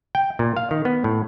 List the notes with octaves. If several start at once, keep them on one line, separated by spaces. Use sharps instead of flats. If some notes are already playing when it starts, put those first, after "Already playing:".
G5
A#2
F5
D#3
B3
A2